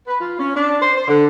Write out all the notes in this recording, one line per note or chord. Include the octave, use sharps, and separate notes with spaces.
B4
F4
C#4
D4
C5
C5
D3